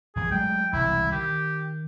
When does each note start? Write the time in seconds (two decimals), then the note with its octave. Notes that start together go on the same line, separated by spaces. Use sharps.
0.16 A#1 E2 G2 G#4
0.31 F#3 G#3 A3 G5
0.73 E1 C2 E4
1.12 D#3 G4